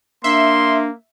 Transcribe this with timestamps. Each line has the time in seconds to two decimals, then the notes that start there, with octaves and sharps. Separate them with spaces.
0.24 A#3 D4 E5 C6